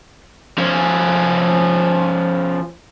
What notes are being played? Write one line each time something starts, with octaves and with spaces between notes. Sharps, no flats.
F3 C#4